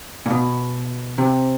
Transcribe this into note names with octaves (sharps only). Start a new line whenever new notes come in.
A#2
B2
C3